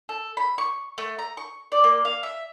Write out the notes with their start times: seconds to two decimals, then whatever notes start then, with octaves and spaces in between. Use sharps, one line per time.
0.09 A4
0.37 B5
0.58 C#6
0.98 A3
1.19 A#5
1.37 C#6
1.72 D5
1.84 A#3
2.05 F5
2.23 E5